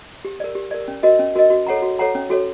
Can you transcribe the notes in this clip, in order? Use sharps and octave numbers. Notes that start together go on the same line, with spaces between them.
G4
A#4 D5
G4
A#4 D5
C#4
F#4 A#4 D#5
C#4
F#4 A#4 D#5
F#4
A4 C#5 F#5 A#5
F#4
A4 C#5 F#5 A#5
C#4
F#4 A4 C#5